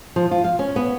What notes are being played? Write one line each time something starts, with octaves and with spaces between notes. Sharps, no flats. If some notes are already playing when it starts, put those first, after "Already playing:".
F3
F4
F5
C#4
B3